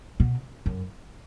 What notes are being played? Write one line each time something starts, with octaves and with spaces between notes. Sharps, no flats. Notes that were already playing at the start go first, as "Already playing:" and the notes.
B2
F#2